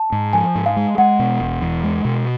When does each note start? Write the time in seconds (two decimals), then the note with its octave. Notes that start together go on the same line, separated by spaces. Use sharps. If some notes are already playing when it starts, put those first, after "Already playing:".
Already playing: A5
0.12 G#2
0.33 F3 G#5
0.55 G#2
0.66 F5
0.76 G#3
0.98 G#3 F#5
1.19 B2
1.41 E1
1.62 E2
1.83 G#3
2.05 B2